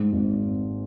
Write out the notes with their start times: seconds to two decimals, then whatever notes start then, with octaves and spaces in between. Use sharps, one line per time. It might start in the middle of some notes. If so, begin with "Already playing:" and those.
Already playing: G#2
0.13 G#1